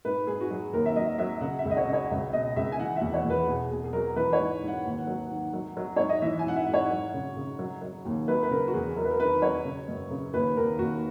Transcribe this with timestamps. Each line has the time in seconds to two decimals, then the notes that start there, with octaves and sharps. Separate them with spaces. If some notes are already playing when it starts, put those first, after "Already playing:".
0.05 G#2 B4
0.27 G#2 G#4
0.41 F#4
0.51 F#3 G#4
0.73 D#2 A#4
0.85 E5
0.96 F#3 D#5
1.18 F#3 E5
1.41 C#3 F#5
1.59 E5
1.65 C#2
1.71 D#5
1.77 C#5
1.87 C#3
1.93 C#5
2.10 C#2 E5
2.33 B2 D#5
2.56 C#2 E5
2.72 G#5
2.79 E3 F#5
2.96 E5
3.01 E2
3.14 C#5
3.25 E2
3.30 B4
3.48 B2 G#4
3.71 B2 G#4
3.84 G#4
3.93 F#3 A#4
4.16 E3 B4
4.33 C#5
4.39 G#2
4.62 G#2
4.68 F#5
4.85 D#2
5.07 F#3
5.30 D#3
5.53 F#3
5.77 F#3
5.96 G#2 C#5
6.09 D#5
6.22 E3 E5
6.39 G#5
6.45 G#2 F#5
6.56 E5
6.68 G#2
6.74 C#5
6.90 F#3
7.14 C#3
7.36 C#3
7.59 F#3
7.82 F#3
8.05 D#2
8.28 F#3 B4
8.43 B4
8.50 C#3 A#4
8.68 F#4
8.74 E2 G#4
8.97 F#3 A#4
9.04 B4
9.11 A#4
9.20 D#3 B4
9.42 F#3 C#5
9.65 C#3
9.88 F#2
10.10 C#3
10.33 D#2 B4
10.57 D#2 A#4
10.79 D#2 F#4